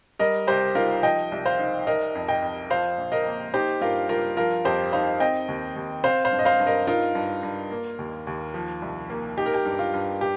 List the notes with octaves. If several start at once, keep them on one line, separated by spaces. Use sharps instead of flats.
G3 A#4 D#5
C2 G4 C5
D#4 F4 A#4
F3 D#5 G5
C2
C5 F5
D#4
D#4 A#4 D#5
F2
D#5 G5
F2
F3 C5 F5
A#1
A#4 D#5
A#3
D#4 G4 C5
G2 F4 A#4
G2 F4 A#4
F3 F4 A#4
F2 G4 C5
D#4 C5 F5
C4 D#5 G5
D#2
D#2
C4 C5 F5
C5 F5
G2
D#5
C5 F5
G2
A#4 D#5
D#4 F4 A#4
G2
G2
A#3
D#2
D#2
F3
C2
A#3
D#4 G4
A#4
G4
G2
F4
G2
G4